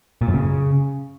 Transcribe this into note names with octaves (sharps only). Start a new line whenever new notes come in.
A#2
F#2
C#3